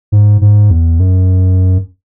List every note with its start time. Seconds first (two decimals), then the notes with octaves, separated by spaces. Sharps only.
0.12 G#2
0.41 G#2
0.71 E2
1.00 F#2